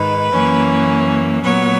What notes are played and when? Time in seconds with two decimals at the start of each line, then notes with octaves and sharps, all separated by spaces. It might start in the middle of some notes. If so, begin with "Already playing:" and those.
Already playing: G#2 D#3 G#3 B4
0.33 F#2 E3 A#3 C#4
1.43 A#2 F#3 B3 C#5